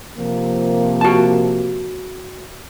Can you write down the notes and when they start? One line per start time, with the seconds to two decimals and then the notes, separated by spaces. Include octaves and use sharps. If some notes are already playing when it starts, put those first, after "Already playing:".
0.18 C3 F3 A#3
1.01 F#4 A5